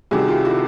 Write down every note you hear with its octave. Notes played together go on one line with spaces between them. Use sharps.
C2 C3 D#3 F#4 G#4
F4 G4
E4 F#4